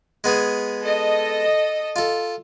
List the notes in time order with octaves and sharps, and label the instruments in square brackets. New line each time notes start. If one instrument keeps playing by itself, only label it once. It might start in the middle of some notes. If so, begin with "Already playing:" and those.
[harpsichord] G#3 B3 G#4
[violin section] A4 D#5
[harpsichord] F4 A4